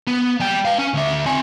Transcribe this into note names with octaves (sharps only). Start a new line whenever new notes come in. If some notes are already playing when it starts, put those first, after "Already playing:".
B3
G3 G5
B4 F5
C#4
D2 E5
C4 G#5